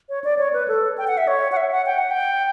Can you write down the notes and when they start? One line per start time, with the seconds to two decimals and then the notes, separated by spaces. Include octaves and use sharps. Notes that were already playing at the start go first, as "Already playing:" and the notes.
0.09 C#5
0.24 D5
0.39 C#5
0.53 B4
0.68 A4
0.98 G5
1.07 F#5
1.18 E5
1.27 C#5
1.52 F#5
1.57 E5
1.72 F#5
1.86 G5
1.98 F#5
2.11 G5